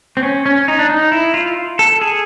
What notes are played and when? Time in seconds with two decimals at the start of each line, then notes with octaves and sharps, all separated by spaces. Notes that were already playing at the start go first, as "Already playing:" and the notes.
0.17 C4
0.23 C#4
0.46 C#4
0.68 D#4
0.79 D4
0.90 D#4
1.12 E4
1.34 F4
1.79 A4
2.01 G#4